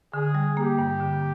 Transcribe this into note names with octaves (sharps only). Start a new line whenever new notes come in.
D3 G#4
G3
A#3 G4
G2
D3